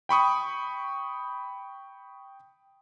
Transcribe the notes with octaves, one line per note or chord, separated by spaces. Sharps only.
G5 B5 C#6 D#6